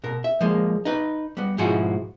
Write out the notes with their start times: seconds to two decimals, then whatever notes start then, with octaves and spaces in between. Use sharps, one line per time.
0.04 B2 A#4
0.24 E5
0.41 F3 G#3 A#3
0.85 D#4 B4
1.37 G3 B3
1.58 G#2 B2 F3 E4 F#4 G#4